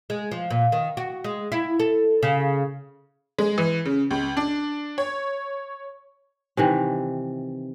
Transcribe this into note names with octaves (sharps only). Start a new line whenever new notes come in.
G#3
F3
A#2
D#3
F#4
G#3
E4
A4
C#3
G#3
E3
C#3
C#2
D4
C#5
C3 D#3 E3